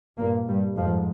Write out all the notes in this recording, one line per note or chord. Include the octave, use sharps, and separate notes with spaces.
G2 A#2 A#3
G2 G3
F2 G#2 F3